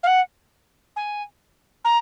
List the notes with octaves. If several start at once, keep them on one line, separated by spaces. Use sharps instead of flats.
F5
F#5
G#5
A#5